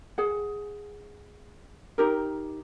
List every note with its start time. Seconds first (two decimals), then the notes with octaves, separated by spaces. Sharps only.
0.18 G#4 F#5
1.98 D#4 G4 A#4